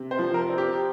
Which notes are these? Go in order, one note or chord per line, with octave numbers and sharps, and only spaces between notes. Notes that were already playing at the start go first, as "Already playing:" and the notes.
Already playing: C3
C5
F3
A#4
C4
G4